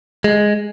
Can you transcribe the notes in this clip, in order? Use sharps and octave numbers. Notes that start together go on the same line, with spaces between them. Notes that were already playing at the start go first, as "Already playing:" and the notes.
G#3